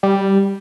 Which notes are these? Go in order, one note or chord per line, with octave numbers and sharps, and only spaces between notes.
G3